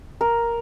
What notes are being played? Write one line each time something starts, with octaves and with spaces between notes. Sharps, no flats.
A#4